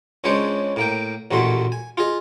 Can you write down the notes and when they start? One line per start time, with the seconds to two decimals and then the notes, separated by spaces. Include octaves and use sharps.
0.24 C#2 C#3 G#3 D4 C5 C#5
0.76 A2 A#3 G5
1.31 A1 D#2 A#2 A3 F#4 C6
1.72 G#5
1.97 F4 G#4 D#5